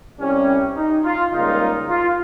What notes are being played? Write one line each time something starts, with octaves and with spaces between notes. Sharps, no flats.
C2 C3 G3 C#4
G4
D#4
F4
C#2 C#3 G3 A#3 D#4 F4
F4